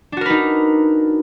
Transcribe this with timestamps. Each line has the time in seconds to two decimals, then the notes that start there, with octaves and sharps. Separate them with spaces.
0.12 D4
0.17 F#4
0.21 A#4
0.26 B4
0.30 D#4